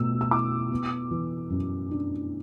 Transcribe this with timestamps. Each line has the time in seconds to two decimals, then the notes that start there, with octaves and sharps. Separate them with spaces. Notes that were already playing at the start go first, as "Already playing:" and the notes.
Already playing: B2 A3 E6
0.21 E6
0.31 E4 D6
0.71 B3
1.11 E3
1.50 F#2
1.91 D4